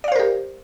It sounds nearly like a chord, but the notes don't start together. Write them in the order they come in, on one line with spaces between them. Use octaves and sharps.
D5 F5 C5 A#4 G4